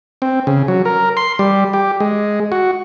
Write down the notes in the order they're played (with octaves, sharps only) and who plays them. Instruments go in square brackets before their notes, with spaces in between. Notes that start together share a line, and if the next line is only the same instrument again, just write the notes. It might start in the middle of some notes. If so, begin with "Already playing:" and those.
[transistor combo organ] C4
C#3
F#3
A#4
C6
G3
G4
G#3
F#4